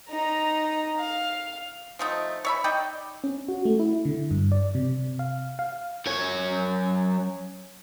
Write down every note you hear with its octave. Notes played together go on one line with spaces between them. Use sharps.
D#4 A#5
F5
F3 A3 D#4
C#5 E5 B5
D#4 D5 G5
C#4
F#4
A3
E4
D3
G2
D5
C3
F5
F5
F#2 C#5